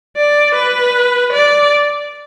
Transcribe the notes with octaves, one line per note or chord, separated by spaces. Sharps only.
D5
B4
D5